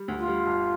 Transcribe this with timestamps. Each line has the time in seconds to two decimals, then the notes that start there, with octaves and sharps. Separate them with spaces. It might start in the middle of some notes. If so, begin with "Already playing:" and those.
Already playing: G3
0.08 D2
0.18 F4
0.28 G3
0.47 G1